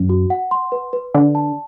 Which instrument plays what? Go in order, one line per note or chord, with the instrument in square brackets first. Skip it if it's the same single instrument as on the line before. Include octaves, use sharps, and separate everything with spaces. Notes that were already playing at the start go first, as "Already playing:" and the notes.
Already playing: [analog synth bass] F#2
[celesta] F#4
F#5
C6
B4
B4
[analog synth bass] D3 [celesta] D5
[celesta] A5